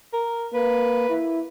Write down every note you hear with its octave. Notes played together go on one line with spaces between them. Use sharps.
A#4
A#3 B4
E4